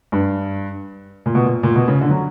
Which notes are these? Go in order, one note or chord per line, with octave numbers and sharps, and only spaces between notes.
G2
A#2
B2
A#2
A#2
B2
C#3
D3
F#3